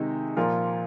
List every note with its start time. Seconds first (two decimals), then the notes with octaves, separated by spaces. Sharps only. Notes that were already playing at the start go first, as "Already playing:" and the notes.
Already playing: C3 D#3 G#3 D#4
0.37 A#2 F3 A#3 F4 A#4